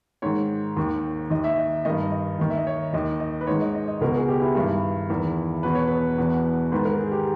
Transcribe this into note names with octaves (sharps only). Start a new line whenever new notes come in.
G#2 D#3 C#5
D#2 D#3
D#2 D#3 D#5
E5
D#5
G2 D#3 D#5
D#5
D#2 D#3
E5
D#5
C#5
D#2 D#3 D#5
D#5
B4
G#2 D#3 C#5
D#5
D#5
D#5
C#2 B2 A#4
G#4
G4
E4
G2 D#3 E4
E2 D#3
E2 B2 B4
C#5
B4
E2 B2
G#2 D#3 B4
A#4
G#4
G4